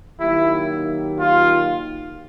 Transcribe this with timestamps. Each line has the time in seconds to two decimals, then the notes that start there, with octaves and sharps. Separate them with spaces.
0.20 D#3 F#3 A#3 D#4 E4 G4
1.20 F4